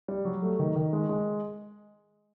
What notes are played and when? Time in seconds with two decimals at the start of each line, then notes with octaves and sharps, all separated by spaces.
0.08 G3
0.25 F#3
0.42 A3
0.59 D#3
0.76 D#3
0.93 G#3
1.09 G#3